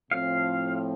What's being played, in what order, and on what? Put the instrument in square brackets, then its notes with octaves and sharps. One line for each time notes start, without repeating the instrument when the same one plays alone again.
[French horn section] A2 F3 C4 [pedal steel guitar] F5